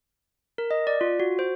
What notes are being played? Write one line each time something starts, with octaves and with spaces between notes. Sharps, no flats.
A#4
D#5
D5
F4
F#4
C5